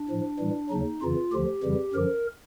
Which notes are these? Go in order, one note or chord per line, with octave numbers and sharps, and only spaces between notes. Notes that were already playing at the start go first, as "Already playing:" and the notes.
Already playing: D4
A2 F3
A2 E3 G3
D#2 C#3 F#3 D#4
F2 C#3 E3 F4
D2 D3 F3 G4
F2 C#3 E3 G3
F#2 D3 F3 A#4